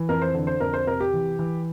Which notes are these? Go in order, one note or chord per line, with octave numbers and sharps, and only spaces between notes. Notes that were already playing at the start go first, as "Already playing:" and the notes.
Already playing: E3
F2 A#4
C5
D3
C5
F2 A#4
C5
C3 A#4
G4
E3
E3